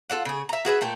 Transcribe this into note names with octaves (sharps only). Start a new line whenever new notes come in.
F4 A4 C#5 F#5
C#3 G#4
E5 A#5
F#4 G#4 B4 E5
A#2 A3 G5